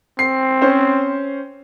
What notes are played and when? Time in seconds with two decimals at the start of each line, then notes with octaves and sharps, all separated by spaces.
0.19 C4 C7
0.62 C#4 C5